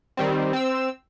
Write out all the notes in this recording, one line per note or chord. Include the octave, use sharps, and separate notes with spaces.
D#3 G3 C4
C4 E6